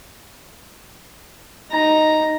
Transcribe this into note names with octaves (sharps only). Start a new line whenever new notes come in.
D#4 A#5